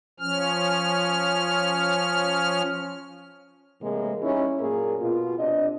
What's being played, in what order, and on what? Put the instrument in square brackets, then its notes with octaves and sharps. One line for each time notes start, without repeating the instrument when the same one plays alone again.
[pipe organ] F3 C#4 F6
[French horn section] A2 C3 E3 G#3 A#3
G3 C#4 D#4 E4
F#2 A#2 A#3 G#4 A#4
B2 F4
C3 D4 D#5